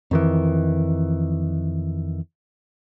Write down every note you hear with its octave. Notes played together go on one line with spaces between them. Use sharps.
F2 D#3 E3